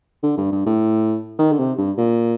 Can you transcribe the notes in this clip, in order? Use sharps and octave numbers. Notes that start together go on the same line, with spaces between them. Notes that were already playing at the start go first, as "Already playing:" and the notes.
D3
G2
G2
A2
D#3
D3
C3
G2
A#2